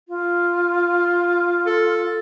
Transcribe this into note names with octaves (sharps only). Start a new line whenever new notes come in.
F4
A4